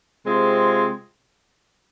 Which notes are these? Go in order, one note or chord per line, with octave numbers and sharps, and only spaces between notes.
C3 G#3 C4 F4